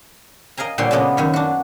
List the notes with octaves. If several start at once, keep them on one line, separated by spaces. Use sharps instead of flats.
A#4 D#5 F5 G#5 A#5
A#2 D3 G3 C5 C#5 C6
C#3 G#3 A#3 B3 D4 D#5
F#2 D#3 C#5
D4 F#4